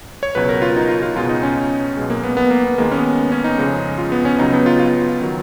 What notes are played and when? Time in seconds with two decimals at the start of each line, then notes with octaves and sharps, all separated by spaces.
0.23 C#5
0.35 C#2 B2 F#3 B4
0.49 A#4
0.62 F4
0.76 D#4
0.88 F4
1.02 F4
1.15 C#2 B2 G#3 F4
1.29 D#4
1.43 C#4
1.97 B1 B2 G#3
2.10 A#3
2.24 B3
2.37 B3
2.51 A#3
2.64 B3
2.78 D#2 D#3 G#3 A#3
2.91 C#4
2.97 B3
3.32 C#4
3.44 D#4
3.58 F2 C#3 G#3
3.98 F4
4.12 B3
4.25 C#4
4.39 C#2 C#3 F#3 D#4
4.53 B3
4.66 F4
4.80 F4
5.22 D#3 F#3